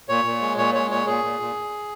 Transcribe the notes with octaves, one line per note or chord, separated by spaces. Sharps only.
A#2 C#5
A#2
G#3
A#2 C#5
G#3 C#5
A#2 C#5
A#2 G#4
A#2
A#2